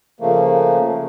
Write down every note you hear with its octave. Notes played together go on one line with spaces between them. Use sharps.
C#3 F3 A3 A#3